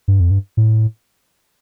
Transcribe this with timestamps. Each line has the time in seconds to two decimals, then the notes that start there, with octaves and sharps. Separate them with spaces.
0.08 G2
0.20 F2
0.31 G2
0.57 A2